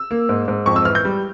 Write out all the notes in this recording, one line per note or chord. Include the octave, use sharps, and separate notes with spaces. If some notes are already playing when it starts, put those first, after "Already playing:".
Already playing: E6
A#3
G#2
G#2
F2 C#6
E6
E3 F6
G6
G3